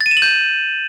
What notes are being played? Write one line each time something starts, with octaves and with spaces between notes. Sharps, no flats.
A6
D#7
E7
F#7
G6